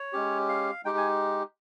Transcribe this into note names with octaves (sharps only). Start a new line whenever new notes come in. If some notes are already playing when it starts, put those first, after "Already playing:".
Already playing: C#5
G#3 C#4 G4
F5
G#3 D#4 G4 G5
G#5